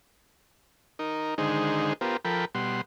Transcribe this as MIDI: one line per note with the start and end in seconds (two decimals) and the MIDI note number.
0.99 1.34 63
0.99 1.34 70
1.38 1.93 50
1.38 1.93 51
1.38 1.93 56
1.38 1.93 63
1.38 1.93 68
1.38 1.93 72
2.01 2.17 59
2.01 2.17 65
2.01 2.17 67
2.01 2.17 70
2.01 2.17 72
2.25 2.45 53
2.25 2.45 69
2.25 2.45 70
2.25 2.45 79
2.25 2.45 83
2.55 2.81 47
2.55 2.81 55
2.55 2.81 78
2.55 2.81 84